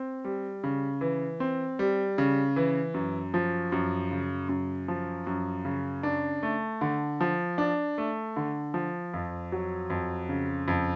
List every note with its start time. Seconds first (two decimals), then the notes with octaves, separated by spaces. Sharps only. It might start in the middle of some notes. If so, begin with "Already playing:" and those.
Already playing: C4
0.25 G3
0.64 C#3
1.01 E3
1.40 C4
1.79 G3
2.18 C#3
2.56 E3
2.94 F#2
3.34 F3
3.72 F#2
4.11 C#3
4.49 F#2
4.88 F3
5.27 F#2
5.65 C#3
6.03 D4
6.43 A3
6.81 D3
7.21 F3
7.58 D4
7.98 A3
8.36 D3
8.74 F3
9.14 F2
9.52 F#3
9.90 F2
10.29 C#3
10.68 F2